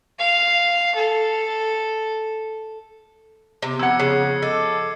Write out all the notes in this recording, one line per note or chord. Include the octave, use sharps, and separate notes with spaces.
F5
A4
C3 B3
F2 F#5 E6 G#6 C#7
C#3 C7
A4 D#5 D6